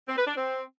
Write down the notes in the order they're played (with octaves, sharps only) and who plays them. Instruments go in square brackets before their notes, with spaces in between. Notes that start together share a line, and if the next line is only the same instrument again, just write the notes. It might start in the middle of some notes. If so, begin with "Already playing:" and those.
[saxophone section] C4
B4
D4
C4